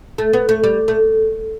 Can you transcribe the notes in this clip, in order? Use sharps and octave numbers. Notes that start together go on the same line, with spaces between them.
A3
B3
A3
G3
A3